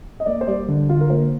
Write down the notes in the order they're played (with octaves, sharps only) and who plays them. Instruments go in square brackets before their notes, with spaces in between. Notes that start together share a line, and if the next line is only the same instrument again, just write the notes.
[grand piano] D#5
A#3 D5
C5
G3 D5
D3
D3 F4
A#4
A#3 C5